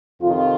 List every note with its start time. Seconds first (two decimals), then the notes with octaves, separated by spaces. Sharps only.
0.22 F2 C3 D#3 F4